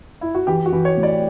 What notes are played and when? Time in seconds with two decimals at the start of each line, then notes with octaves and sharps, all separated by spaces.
0.21 E4
0.35 F#4
0.47 E3 G4
0.66 F#4
0.72 E3
0.85 C#5
0.97 A2
1.03 D5